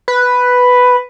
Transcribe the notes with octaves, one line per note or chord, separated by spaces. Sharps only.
B4